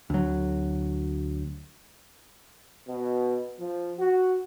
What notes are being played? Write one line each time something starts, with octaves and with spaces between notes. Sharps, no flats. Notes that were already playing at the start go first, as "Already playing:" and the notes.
D2 F#3
B2
F3
F#4